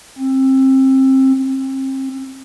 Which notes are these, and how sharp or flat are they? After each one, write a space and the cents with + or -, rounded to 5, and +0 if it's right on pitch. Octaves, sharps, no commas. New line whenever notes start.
C4 +25
C4 +35